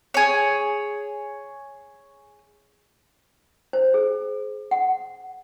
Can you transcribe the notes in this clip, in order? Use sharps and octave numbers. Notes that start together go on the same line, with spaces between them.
G#4 C#5
C5
G#4
F#5